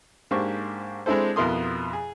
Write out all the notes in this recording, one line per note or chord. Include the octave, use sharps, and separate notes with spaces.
G#2 A#3 D4 G4 C5 C#6
G#3 C4 D4 E4 A4 C5
F2 B2 E4 A#4 C6 D#6
G#4